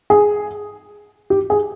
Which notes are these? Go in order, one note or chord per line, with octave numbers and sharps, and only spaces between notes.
G#4
G4
G#4